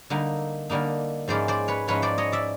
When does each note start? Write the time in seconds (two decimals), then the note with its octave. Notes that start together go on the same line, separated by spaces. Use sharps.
0.10 D3 G3 A#3 D#4
0.70 D3 G3 A#3 D#4
1.28 G#2 F3 G#3 C#4 E4 C5 D5
1.48 C5 D5
1.68 B4 C#5
1.88 G#2 F3 G#3 C#4 E4 B4 C#5
2.02 C5 D5
2.18 C#5 D#5
2.32 D5 E5